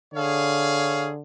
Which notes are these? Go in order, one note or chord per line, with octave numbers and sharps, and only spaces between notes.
D3 G#4 C#5 F5